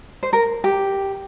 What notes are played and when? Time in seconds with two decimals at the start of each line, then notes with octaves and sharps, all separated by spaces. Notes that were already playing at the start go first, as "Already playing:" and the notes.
0.23 C5
0.33 A#4
0.64 G4